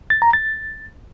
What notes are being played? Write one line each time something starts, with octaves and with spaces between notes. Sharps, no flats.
A6
A#5
A6